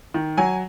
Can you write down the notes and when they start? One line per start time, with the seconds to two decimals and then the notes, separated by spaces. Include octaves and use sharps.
0.14 D#3
0.37 F#3 G#5